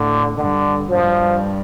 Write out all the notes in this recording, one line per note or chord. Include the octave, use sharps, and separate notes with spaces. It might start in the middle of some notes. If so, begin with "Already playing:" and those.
Already playing: A2 D3
G2 D3
G2 F3